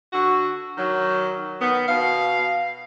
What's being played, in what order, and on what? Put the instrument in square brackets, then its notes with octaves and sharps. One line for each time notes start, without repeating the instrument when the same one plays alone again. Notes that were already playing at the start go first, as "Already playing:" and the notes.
[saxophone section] D3 F#4
D#3 F#3
D#3 B3
B2 F5